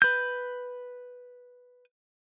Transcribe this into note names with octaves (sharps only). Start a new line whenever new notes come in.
B4 G6